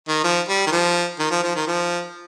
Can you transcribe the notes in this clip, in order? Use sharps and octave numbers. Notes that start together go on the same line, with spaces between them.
D#3
F3
G3
D#3
F3
D#3
F3
F3
D#3
F3